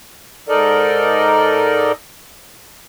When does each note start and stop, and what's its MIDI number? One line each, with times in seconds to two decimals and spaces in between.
0.49 1.92 44
0.49 1.92 63
0.49 1.92 69
0.49 1.92 70
0.49 1.92 74
0.49 1.92 75